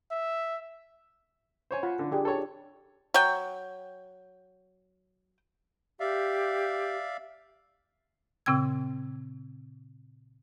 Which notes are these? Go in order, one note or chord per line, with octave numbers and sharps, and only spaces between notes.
E5
C5 C#5 G#5
F4 F#5 B5
D3
D4 G4 G#4
A4 C#5
F#3 G5
G4 D5 E5 F5
A#2 C#3 C4 G5 E6 G#6